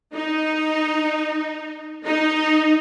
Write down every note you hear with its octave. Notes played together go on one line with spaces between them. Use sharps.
D#4
D#4